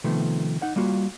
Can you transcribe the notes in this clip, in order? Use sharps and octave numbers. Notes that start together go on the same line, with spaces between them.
C3 D#3 F3 A3 B3
D#4 F#5
G3 A#3 F4 F#4